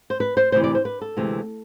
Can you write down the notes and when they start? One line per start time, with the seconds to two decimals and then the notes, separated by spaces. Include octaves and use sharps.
0.10 C5
0.20 B4
0.37 C5
0.52 D2 C3 E3 C5
0.64 D5
0.75 C5
0.85 B4
1.01 A4
1.17 D2 C3 E3 G#3 C4